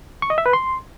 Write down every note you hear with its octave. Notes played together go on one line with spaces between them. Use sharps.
C#6
D#5
E5
B4
C6